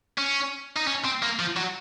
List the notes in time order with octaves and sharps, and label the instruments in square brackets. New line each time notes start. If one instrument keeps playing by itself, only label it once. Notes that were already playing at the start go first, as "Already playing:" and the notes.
[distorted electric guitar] C#4
D#4
C#4
C4
A#3
F3
F#3